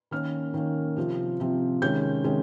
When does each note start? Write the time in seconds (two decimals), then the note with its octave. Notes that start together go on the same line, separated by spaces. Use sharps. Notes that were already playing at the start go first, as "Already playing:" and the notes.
0.11 D#3 A#3 C#4 F6
0.54 D#3 A#3 C#4
0.96 C3 F3 C4
1.40 C3 F3 C4
1.82 C3 D#3 G#3 C#4 G6
2.24 C3 D#3 G#3 C#4